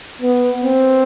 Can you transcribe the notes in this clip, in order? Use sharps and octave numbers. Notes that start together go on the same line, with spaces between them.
B3
C4